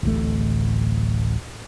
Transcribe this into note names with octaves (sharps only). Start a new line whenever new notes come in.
D1 A1 A3